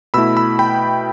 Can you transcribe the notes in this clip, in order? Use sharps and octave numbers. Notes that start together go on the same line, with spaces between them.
B2 A3 E4 B5 E6
B5 E6
G5 B5